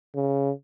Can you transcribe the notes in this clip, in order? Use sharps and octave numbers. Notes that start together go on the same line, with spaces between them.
C#3